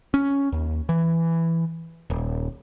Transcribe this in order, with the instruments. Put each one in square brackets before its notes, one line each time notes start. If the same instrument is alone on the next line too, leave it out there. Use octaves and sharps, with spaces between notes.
[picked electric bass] C#4
D#2
E3
D#1